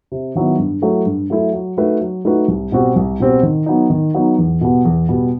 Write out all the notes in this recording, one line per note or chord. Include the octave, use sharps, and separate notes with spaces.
C3
D#3 F#3 B3 E4
G2
F#3 A3 E4 A4
G2
F#3 A3 E4 A4
F#3
A3 D#4 F#4 B4
F#3
A3 D#4 F#4 B4
C2
B2 G3 C4 F#4
C2
B2 G3 C4 F#4
D#3
F#3 B3 D#4
D#3
F#3 B3 D#4
E2
B2 G3 B3
E2
B2 G3 B3